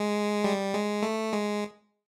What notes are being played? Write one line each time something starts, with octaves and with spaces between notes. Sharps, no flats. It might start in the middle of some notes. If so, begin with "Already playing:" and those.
Already playing: G#3
G3
G#3
A3
G#3